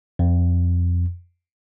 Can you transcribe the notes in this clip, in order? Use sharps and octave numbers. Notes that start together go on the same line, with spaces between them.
F2